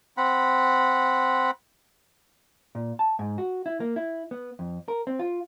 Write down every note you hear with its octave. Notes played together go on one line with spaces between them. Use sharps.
C4 F#5 B5
A#2
A5
G#2
F#4
E4
A#3
E4
B3
F2
A#4
C4
F4